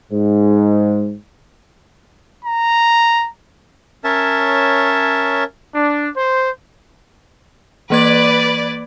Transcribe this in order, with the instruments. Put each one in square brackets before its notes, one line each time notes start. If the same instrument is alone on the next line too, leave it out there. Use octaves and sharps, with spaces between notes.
[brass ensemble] G#2
[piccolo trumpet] A#5
[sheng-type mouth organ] C#4 A#4 C#5 E5 A5
[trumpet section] D4
C5
[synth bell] E3 A#3 G#6 [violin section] B4 D5